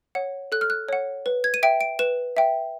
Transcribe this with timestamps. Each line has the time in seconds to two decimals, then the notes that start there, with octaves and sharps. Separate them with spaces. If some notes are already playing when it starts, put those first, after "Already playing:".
0.15 C#5 F#5
0.52 A4 F#6
0.61 F6
0.70 F#6
0.89 C#5 F#5
1.26 B4
1.44 G#6
1.54 D#7
1.63 E5 G5 D7
1.81 D7
1.99 B4 E7
2.37 E5 G5